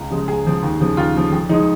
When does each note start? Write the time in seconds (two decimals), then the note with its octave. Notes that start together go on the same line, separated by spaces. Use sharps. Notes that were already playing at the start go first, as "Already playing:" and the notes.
Already playing: C#2
0.11 C#3 F3 G#3
0.28 C#2 G#4
0.45 C#3 F3 G#3
0.63 D#2
0.80 C#3 F3
0.97 D#2 F4
1.15 C#3 F3
1.32 F2
1.49 F3 G#3 D#4